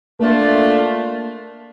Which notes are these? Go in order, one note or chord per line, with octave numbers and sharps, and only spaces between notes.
A3 A#3 D4 F4